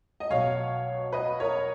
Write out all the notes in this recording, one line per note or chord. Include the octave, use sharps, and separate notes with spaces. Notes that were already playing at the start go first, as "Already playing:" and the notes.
D#5
B1 B2 F#3 C#5 F5
B4 D#5
A#4 C#5